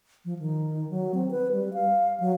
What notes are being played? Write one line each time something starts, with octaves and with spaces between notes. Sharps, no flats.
F3
D#3
F#3
C4
B4
G3
F5
F#3